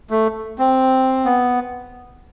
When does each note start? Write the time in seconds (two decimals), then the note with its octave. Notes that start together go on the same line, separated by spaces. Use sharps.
0.10 A3
0.59 C4
1.25 B3